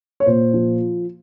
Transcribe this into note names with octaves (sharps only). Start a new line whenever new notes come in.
C#5
A#2 C5
F3